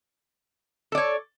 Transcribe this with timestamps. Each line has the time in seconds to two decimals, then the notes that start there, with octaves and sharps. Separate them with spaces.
0.92 A4
0.95 D5
0.98 C#5